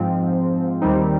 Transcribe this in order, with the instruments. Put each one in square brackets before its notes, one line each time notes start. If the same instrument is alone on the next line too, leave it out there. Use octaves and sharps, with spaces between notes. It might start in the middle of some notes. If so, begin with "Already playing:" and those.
Already playing: [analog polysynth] G#2 F3 C4
D#2 D#3 G3 C4 D#4